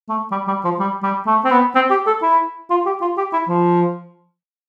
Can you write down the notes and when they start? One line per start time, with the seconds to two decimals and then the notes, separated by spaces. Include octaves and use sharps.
0.09 A3
0.31 G3
0.47 G3
0.64 F3
0.79 G3
1.03 G3
1.27 A3
1.45 C4
1.51 B3
1.75 C4
1.90 G4
2.07 A4
2.22 E4
2.70 F4
2.86 G4
3.01 F4
3.17 G4
3.33 E4
3.49 F3